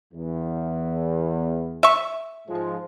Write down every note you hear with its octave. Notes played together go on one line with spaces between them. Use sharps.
E2
E5 C#6
G#2 F3 G#3